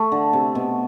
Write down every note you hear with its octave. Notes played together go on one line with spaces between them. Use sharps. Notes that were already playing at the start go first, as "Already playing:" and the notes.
Already playing: A3
D3
C3
B2